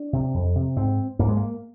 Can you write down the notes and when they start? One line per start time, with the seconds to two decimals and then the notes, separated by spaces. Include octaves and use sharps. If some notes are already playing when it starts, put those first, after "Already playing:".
Already playing: D4
0.13 C3
0.34 F2
0.55 C3
0.77 G#2 C4
1.19 G#2 A#3
1.28 G#3
1.37 A#3